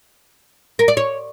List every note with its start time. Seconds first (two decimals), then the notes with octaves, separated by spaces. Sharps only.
0.79 A#4
0.88 D5
0.97 C#5